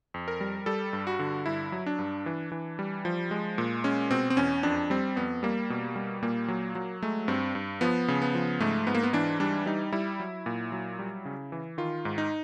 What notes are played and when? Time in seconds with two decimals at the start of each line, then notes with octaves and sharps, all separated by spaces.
0.14 F2
0.28 A#4
0.41 G3
0.66 G3 A4
0.93 G2
1.07 F#4
1.19 D3
1.46 G2 E4
1.72 F#3
1.86 D4
1.99 G2
2.26 E3
2.52 E3
2.79 G3
3.05 F3
3.31 G#3
3.58 A#2
3.84 G#3 C#4
4.11 B2 C4
4.30 C4
4.37 E2 C#4
4.63 F2 D4
4.90 G3 C4
5.16 F2 B3
5.43 G3 A#3
5.70 B2
5.96 G3
6.22 A#2 A#3
6.48 F#3
6.75 F#3
7.03 G#3 A3
7.28 G2 C4
7.55 G2
7.81 F3 B3
8.08 C#3
8.22 B3
8.35 F3
8.60 G#2 A3
8.87 G#2 B3
8.95 A#3
9.03 B3
9.13 E3 D4
9.40 G3 D4
9.66 G3 D#4
9.92 G3 E4
10.20 F#3
10.46 A#2
10.72 F#3
10.99 G3
11.25 C#3
11.52 E3
11.78 D#3 F4
12.05 G#2
12.18 D#4